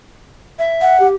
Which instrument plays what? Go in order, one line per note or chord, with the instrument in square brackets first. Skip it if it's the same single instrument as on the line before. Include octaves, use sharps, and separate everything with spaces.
[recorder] E5
[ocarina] F#5
[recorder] G4